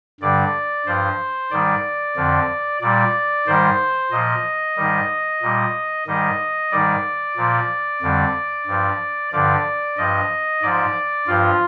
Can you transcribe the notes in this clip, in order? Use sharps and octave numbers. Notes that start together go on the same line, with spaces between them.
G2 D3 G3 D5
G2 F3 C5
G#2 D#3 G3 D5
F2 D3 F3
A#2 G3 D5
G#2 D#3 G3 C5
A#2 F3 D#5
G#2 D#3 G3
A#2 G3
G#2 D#3 G3 D#5
G#2 D#3 G3 D5
A#2 F3
F2 D3 G3
G2 F3
G2 D3 F3 D5
G2 F3 D#5
G#2 F3 D5
G2 F3 F4